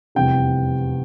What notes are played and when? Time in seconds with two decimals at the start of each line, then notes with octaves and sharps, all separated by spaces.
0.15 F1 E2 C3 G3 G5